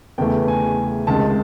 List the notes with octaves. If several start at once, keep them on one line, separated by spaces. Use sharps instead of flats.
E2 C#3 E3 A3 G5
G#5
C#2 C3 D#3 G#3 A5